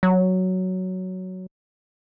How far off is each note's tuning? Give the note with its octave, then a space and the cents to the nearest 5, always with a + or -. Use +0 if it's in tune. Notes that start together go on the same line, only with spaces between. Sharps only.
F#3 +5